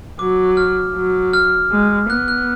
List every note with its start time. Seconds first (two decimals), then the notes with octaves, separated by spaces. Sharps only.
0.19 F#3 D6
0.57 F6
0.95 F#3
1.33 F6
1.72 G#3
2.10 B3 F#6
2.28 F#6